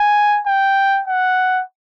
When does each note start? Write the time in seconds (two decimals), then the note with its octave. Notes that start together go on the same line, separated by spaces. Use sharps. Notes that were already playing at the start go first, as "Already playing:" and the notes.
Already playing: G#5
0.47 G5
1.07 F#5